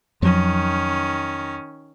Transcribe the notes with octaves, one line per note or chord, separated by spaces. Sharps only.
F2 D#3 F3 F#3 C#4